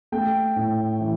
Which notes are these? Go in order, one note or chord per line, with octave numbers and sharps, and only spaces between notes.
A3 G5
A2
E3